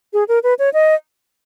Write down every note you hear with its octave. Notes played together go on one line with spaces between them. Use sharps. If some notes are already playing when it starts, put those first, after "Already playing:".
G#4
A#4
B4
C#5
D#5